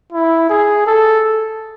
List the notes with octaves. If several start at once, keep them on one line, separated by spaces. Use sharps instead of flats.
E4
G#4
A4